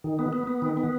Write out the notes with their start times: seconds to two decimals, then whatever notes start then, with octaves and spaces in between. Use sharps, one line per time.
0.04 D#3
0.19 B3
0.33 B3
0.47 B3
0.62 D#3
0.77 B3